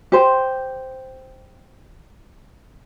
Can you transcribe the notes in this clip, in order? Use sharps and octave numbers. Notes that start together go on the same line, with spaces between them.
G4 C5